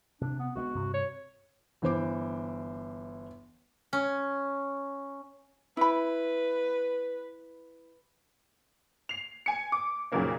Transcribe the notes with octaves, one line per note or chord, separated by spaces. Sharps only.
C3 D4
B3
D2 G#3 B3 F#4
G2 C3
C#5
G1 E3 C5 D6
C#4
E4 B4 B5
C7 F7
G#5 C#7
D6
F2 A#2 C#3 F#3 A#3 D#4